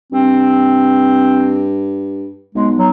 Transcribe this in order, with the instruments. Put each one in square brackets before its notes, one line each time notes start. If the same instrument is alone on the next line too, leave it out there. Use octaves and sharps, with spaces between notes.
[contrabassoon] G2 [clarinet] C4
[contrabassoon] B1 [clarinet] G#3
[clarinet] F#3